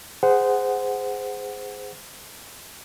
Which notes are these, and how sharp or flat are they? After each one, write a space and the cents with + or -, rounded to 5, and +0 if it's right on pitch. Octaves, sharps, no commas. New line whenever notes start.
G#4 -10 C5 -20 F#5 +5